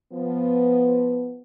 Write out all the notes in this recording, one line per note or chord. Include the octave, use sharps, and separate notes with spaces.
F3 B3